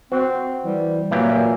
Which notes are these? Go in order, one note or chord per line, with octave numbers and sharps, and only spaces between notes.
C4 F#4 C5
E3 G3
A#2 E3 F#3 A#3 G4